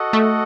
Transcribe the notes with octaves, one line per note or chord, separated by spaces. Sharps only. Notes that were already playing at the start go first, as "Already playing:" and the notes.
Already playing: F#4 A4 D#5 F#5
A3